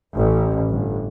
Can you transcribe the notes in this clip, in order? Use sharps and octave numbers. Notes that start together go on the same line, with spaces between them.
A1
G1